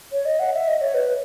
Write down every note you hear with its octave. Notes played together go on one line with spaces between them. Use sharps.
C#5
D#5
F#5
E5
D#5
C#5
B4